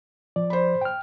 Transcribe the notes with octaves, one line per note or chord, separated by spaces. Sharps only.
F3 D5
C5 B5
G5 F6